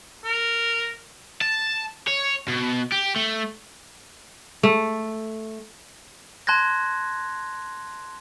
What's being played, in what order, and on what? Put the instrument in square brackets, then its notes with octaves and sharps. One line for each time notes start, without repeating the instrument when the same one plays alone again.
[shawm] A#4
[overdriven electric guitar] A5
C#5
B2
G4
A3
[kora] A3
[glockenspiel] A5 C6 F#6 G#6 A#6